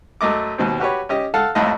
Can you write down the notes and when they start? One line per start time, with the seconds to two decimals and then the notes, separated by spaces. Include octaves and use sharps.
0.21 F#2 A3 D#5 D6
0.58 D#2 B2 C4
0.80 F#4 G4 B4 C#5
1.09 C#4 G4 D#5
1.34 A4 F5 F#5 A5
1.55 A1 F2 A2 D#5